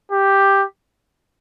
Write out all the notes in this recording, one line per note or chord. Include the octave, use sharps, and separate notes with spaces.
G4